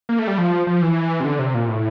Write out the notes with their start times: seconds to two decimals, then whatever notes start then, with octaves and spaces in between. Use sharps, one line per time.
0.09 A#3
0.19 A3
0.27 G3
0.38 F3
0.67 F3
0.82 E3
1.20 C3
1.25 D3
1.39 C3
1.54 A#2
1.68 A2